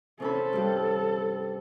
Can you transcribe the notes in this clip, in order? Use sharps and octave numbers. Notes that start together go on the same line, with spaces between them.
C3 C#4 A4 B5
G2 G3